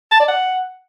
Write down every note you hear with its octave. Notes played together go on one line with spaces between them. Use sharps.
A5
D5
F#5